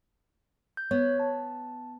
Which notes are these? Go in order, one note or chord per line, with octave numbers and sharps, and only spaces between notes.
G6
B3 C#5
A5